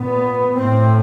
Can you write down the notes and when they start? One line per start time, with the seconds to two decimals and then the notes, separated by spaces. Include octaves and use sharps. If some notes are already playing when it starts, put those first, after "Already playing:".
Already playing: A#2 B3
0.57 A2 C4